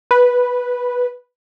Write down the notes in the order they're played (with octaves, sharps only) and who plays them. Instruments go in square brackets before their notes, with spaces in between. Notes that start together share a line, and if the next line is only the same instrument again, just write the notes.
[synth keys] B4